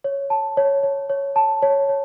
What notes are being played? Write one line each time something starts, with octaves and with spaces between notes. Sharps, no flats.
C#5
A5
C#5
C#5
C#5
A5
C#5
C#5